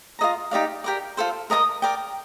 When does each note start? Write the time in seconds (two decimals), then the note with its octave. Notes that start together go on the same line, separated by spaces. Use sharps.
0.19 F4 A4 D#5 A#5
0.51 D#4 G4 D5 F5
0.84 G4 A#4 D5
1.17 F4 A4 C5
1.50 A#4 D#5 A5 D#6
1.82 A#4 D5 G5